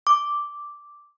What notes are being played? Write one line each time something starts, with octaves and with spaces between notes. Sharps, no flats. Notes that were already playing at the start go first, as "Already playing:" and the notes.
D6